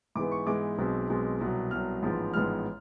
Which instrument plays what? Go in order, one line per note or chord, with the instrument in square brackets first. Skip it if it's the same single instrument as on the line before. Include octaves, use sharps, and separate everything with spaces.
[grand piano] G#2 E3 G#3 B3 D6
C#6
G#2 E3 G#3 B3 D6
B1 B2 G#3 C4
B1 B2 G#3 C4
C2 B2 F#3
C2 B2 F#3 F6
A1 G#2 F3 G#3 B3
A1 G#2 F3 G#3 B3 F6